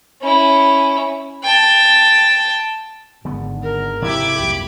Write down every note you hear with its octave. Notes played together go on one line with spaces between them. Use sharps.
C#4 E4
G5 A5
G#1 D3 B3
A#4
C3 F3 E4 G4 B5 D6 G#6
F#1 C2 F2 G4